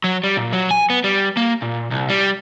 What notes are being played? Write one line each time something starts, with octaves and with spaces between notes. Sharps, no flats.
F#3
G3
A#2
F#3
G#5
B3
G3
A#3
A#2
C2
G3